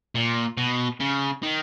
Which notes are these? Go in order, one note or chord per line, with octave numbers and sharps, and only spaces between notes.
A#2
B2
C#3
D#3